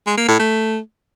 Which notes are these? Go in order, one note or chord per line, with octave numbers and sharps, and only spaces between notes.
G#3
A#3
A2
A3